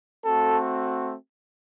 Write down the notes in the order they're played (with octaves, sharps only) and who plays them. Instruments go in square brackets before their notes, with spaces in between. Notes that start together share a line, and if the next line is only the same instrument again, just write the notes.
[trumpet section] A3 C4 F#4 A4